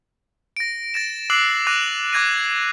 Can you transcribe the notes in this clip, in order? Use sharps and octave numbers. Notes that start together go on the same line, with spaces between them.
A#6 D7
A6 A#6 E7
D6 E6 F#6 C7 F#7
D6 F#6 A#6 D#7 F7
D6 F#6 G#6 A#6 D#7